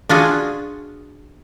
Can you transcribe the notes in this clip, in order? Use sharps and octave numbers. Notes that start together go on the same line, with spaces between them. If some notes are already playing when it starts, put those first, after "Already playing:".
D4 F4 F#4 G#4